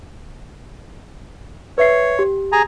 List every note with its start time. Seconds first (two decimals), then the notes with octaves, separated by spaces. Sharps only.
1.78 B4 C#5 E5 C7
2.19 G4
2.52 G#4 G#5 A#5